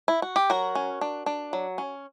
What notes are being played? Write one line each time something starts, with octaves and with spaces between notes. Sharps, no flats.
E4
F#4
G4
F#3 F#4 A#4
C#4
D4
D4
F#3
C#4